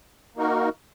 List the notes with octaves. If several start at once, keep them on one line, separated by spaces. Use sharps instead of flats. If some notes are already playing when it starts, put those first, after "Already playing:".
A#3 D#4 F#4 A#4